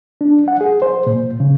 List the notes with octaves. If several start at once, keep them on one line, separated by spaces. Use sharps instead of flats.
D4
F#5
G#4
C5
A#2
C#3